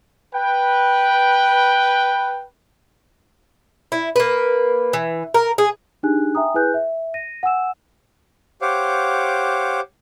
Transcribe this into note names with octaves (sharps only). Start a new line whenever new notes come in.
B4 G5
E4
A#3 B4
E3
A#4
G#4
D4 D#4 G4 G#4 G#5 F#6
E5 G5 G#5 A#5 D#6
E4 G#4 B4 G#5 F#6 G6
E5
A#6 D#7
F#5 G#5 E6 E7
G4 C5 C#5 F5 F#5 D6